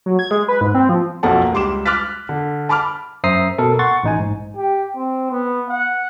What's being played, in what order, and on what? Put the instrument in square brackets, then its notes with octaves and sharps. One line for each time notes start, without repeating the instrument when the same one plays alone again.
[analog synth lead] F#3
G#6
G#3
B4
G#2
C4
F3
[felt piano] B1 F2 A#3 A4 F#5 A5
C#2 G3 C6 D6 E7
D6 F6 F#6 A6 B6
D3
A5 B5 D6 F6
[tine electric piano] F#2 C5 E5 A#5 D#6 C7
B2 A4 A#4
F#5 C6 C#6 A6
A1 D#4 G#5
G#2
[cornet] G4
C4
B3
F#5